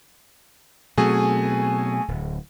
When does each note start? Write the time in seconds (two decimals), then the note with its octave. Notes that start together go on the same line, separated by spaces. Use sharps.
0.97 B2 F#3 A3 C4 F#4 G#4 G#5
2.08 D1